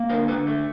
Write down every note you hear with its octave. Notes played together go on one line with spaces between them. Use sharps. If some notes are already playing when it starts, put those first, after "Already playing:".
Already playing: A#3
D3 A#4 C5
D3 A4 B4
A3